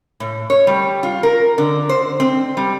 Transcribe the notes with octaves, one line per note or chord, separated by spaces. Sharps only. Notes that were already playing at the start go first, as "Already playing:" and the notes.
A2
C#5
G3
F4
A#4
D3
C5
C4
G3